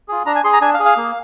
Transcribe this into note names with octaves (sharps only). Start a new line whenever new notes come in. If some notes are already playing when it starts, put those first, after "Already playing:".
F4 G#4
D4 A#5
G#5
G#4 C6
A#5
D4 G#5
F5
G#4
F5
A#3